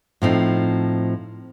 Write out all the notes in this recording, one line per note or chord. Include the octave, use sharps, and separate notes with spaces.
A2 F3 C4 D#4